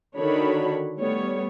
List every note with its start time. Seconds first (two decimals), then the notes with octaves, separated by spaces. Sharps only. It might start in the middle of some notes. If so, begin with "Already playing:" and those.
0.16 D3 D#3 D4 F#4 C#5 B5
0.97 G3 A3 B3 C#5